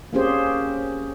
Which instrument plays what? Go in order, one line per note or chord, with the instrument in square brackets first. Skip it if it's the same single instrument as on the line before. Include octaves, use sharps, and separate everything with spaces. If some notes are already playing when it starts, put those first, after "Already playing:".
[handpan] A#3 C4 C#4 G4 G#4 C5